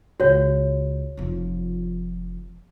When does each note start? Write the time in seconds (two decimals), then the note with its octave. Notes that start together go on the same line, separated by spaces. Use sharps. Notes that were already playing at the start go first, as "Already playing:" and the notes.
0.20 C#2 F#4 C#5
1.17 F1 F3